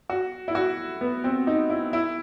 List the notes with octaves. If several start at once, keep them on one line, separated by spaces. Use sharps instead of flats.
F#4
E4
F#4
B3
C4
D#4
E4
E4